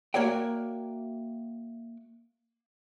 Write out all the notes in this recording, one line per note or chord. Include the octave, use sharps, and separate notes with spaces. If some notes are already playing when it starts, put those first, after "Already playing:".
A#3 F#4 C#5 D5 E5 G5